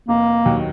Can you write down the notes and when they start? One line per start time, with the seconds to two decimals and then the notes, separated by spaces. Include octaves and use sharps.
0.08 F1 A#3
0.46 D#2 D#3 F#3